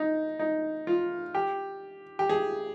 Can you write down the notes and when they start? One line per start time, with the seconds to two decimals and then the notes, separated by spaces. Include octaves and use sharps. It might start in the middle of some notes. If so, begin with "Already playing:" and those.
Already playing: D#4
0.39 D#4
0.87 F4
1.35 G4
2.19 G4
2.29 G#4